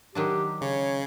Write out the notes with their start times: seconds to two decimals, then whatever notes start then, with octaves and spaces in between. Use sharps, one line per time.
0.15 D#3 F#3 D4 G4
0.61 C#3 C#5